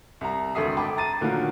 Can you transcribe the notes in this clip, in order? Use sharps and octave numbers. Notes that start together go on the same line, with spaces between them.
C2 A#5
G#1 D2 A4 E5 D#6 C7
G5 A5 B5 D6
A#5 A6 D#7
A#2 D3 D#3 F#3 A3 A#3